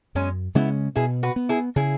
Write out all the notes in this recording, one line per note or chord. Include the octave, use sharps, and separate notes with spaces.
F#2 G#3 C#4
C#3 G#3 B3 C#4 E4
B2 E4 G#4
F#4 B4
B3
E4 G#4
C#3 E4 G#4